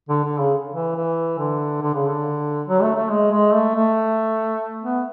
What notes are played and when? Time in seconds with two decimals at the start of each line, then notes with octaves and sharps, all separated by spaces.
0.09 D3
0.24 D3
0.38 C#3
0.74 E3
0.95 E3
1.39 D3
1.81 D3
1.94 C#3
2.07 D3
2.68 F#3
2.82 A3
2.96 A3
3.11 G#3
3.32 G#3
3.54 A3
3.75 A3
4.82 B3